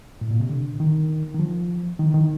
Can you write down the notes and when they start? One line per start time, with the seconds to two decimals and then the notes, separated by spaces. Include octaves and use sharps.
0.21 A2
0.31 A#2
0.40 C3
0.50 D3
0.80 D#3
1.34 D#3
1.40 F3
1.99 D#3
2.14 D#3